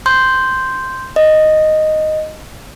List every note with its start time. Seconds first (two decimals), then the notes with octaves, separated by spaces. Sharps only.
0.06 C6 G6
1.16 D#5